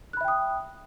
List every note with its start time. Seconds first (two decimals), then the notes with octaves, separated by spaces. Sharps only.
0.13 F#6
0.17 B5
0.21 E5
0.24 G5
0.28 D#6